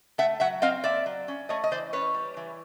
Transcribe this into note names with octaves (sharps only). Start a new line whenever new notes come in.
A3 E5 F#5
F#3 E5 F#5
C4 D#5 F5
A#3 D5 E5
F#3
C#4
A3 C#5 D#5
D#5
E3 C5 D5
C#4 B4 C#5
G3
E3